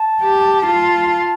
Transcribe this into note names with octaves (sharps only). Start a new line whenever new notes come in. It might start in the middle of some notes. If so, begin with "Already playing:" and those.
Already playing: A5
G4
F4